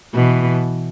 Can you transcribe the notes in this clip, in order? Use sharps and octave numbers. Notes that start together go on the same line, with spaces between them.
B2 E3